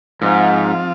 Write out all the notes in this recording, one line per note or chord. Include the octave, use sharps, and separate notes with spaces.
G#2 F3 C4 F4